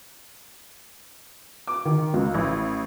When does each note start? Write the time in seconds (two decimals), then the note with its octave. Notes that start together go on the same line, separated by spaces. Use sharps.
1.67 D6
1.85 D#3
2.14 C#2
2.34 A1